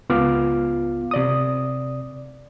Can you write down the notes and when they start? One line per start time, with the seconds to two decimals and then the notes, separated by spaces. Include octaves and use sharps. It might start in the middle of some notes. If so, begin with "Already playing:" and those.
0.09 C#2 B3 F4 F5 D6 F6
1.11 C3 D5 D#6